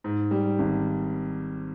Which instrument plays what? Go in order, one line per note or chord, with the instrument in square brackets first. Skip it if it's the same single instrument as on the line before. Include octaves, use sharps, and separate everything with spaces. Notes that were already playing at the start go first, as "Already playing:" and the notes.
[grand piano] G#2
G3
G#1